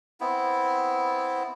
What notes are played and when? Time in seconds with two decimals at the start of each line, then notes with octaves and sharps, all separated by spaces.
0.20 B3 C4 E4